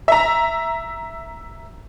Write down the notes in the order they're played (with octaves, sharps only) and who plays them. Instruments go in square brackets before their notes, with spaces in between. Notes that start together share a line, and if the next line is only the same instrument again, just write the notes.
[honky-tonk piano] E5 A#5